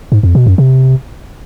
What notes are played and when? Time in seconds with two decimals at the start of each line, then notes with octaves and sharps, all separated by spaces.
0.12 G#2
0.23 F2
0.35 B2
0.47 F#2
0.58 C3